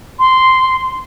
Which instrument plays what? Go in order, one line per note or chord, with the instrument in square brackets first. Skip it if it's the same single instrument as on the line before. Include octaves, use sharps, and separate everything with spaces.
[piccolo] C6